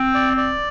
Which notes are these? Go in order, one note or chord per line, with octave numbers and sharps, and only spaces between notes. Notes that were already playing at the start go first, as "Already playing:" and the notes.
Already playing: C4 G5
D5
D5